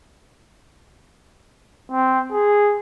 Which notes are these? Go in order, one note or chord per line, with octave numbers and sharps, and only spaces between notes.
C4
G#4